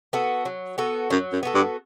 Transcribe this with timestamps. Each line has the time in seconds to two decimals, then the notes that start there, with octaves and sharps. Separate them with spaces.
0.13 B3 F#4 A4
0.45 F#3
0.78 B3 F#4 A4
1.10 F#2 F#3
1.32 F#2
1.43 B3 F#4 A4
1.55 G2